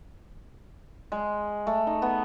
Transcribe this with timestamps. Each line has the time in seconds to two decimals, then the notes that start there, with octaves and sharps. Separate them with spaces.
1.12 G#3
1.67 A3
1.87 D#4
2.02 B3